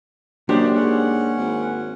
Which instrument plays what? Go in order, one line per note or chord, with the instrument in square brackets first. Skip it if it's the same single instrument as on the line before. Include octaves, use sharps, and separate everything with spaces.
[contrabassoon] F#2 [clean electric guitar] A#3 [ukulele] D4 G4 C5 [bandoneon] D#4
[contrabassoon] G#2 [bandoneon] C#4 F#5
[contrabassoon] G#1